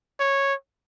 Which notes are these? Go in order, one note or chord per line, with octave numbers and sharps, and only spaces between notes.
C#5